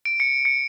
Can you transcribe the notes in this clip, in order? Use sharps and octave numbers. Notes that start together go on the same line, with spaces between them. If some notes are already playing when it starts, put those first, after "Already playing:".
D7
C#7
C#7